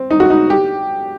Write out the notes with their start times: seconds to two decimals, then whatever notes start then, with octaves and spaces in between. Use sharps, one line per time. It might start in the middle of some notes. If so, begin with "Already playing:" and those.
Already playing: C4
0.11 D#4
0.20 F#4
0.30 D#4
0.50 G4